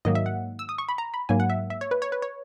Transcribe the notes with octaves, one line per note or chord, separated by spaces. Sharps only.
G#2 D#3 F#3 A#3 D#5
E5
F#5
E6
D#6
C#6
B5
A#5
B5
G#2 F#3 A#3 G#5
F#5
E5
E5
C#5
B4
C#5
B4
C#5